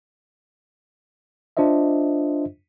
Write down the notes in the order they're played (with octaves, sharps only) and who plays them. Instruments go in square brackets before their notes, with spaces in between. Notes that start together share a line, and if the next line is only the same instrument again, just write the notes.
[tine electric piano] D4 F4 C5 D#5 E5